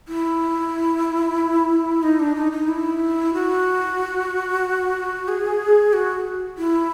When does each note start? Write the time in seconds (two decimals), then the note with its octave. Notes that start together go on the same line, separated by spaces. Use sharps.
0.08 E4
2.03 D#4
2.20 D4
2.35 D#4
2.52 D#4
2.68 E4
3.34 F#4
5.28 G#4
5.93 F#4
6.58 E4